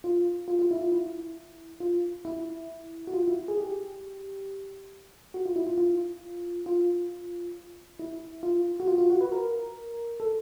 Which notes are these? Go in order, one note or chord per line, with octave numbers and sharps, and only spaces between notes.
F4
F4
F4
E4
F4
E4
F4
E4
F#4
F4
E4
G#4
G4
F#4
F4
E4
F4
F4
F4
E4
F4
F#4
F4
F4
F#4
B4
A#4
A4